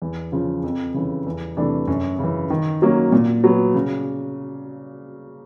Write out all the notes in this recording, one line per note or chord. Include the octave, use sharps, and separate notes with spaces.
E2
C#3 F3
F2
C#3 E3
E2
C3 E3 A3 D4
F#2
C#3 E3
D#3
F#3 A#3 C#4
A#2
F#3 B3
C#3